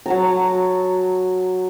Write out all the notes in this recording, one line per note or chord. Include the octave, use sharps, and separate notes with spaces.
F#3 A5 A#5